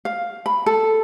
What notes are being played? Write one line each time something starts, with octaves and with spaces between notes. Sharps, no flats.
F5
B5
A4